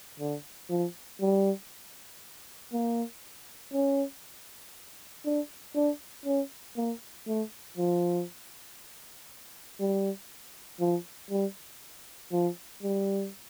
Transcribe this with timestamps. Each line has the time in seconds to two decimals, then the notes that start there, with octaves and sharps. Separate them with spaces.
0.20 D3
0.70 F3
1.21 G3
2.73 A#3
3.73 C#4
5.25 D4
5.75 D4
6.25 C#4
6.76 A#3
7.27 A3
7.77 F3
9.80 G3
10.80 F3
11.30 G3
12.32 F3
12.83 G3